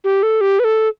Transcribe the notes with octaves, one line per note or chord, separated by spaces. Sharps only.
G4
A4
G4
B4
A4